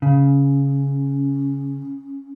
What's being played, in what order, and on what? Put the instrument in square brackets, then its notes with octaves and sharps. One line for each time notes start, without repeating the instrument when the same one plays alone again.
[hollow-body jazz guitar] C#3 [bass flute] C#4